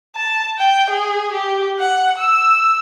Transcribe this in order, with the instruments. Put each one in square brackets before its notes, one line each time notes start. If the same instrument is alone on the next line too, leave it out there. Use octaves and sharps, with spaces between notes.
[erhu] A5
G5
G#4
G4
F#5
E6